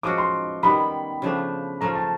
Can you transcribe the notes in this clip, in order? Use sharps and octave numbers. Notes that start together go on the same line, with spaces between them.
F3 G#3 C#4 F#4 D6
C6
D#3 G3 B3 B5
C#3 F3 A3 D4
F3 A3 C#4 F4 A#5
A5